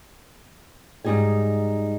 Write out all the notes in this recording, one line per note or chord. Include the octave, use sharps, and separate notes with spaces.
G#2 G3 D#4 G#4 G#5